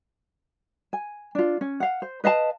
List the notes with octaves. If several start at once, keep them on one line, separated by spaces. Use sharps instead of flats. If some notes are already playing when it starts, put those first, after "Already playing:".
G#5
D4 F4
C#4
F5 F#5
C5
B4 D#5 F5 A5